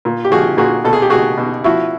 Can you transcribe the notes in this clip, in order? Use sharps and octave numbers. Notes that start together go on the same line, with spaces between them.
A#2
G4
F3 F#4 G#4
A#2 F#4 G#4
B2 A4
G#4
G4
B2 F#4 G#4
B2
F3 E4 F#4